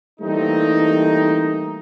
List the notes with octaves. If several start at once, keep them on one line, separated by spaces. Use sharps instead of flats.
E3 G3 A3 A#3 C4 D#4